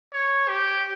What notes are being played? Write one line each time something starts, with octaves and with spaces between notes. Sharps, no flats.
C#5
G4